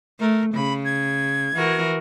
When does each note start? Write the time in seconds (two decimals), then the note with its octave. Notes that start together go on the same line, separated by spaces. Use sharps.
0.20 A3 A#4
0.55 C#3 B5
0.85 G#6
1.55 E3 F#4 A#4